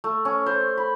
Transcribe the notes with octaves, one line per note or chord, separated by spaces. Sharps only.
A3
C#4
C5
B5